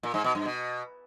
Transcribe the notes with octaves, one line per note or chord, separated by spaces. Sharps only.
A#2
G#2
B2
G2
B2